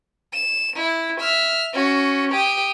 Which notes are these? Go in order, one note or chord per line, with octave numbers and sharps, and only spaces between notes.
E7
E4
E5 F6
C#4 F#4
G4 D#6